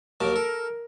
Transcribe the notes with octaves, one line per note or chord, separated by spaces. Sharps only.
D#2 F#3 A#4 A5
A4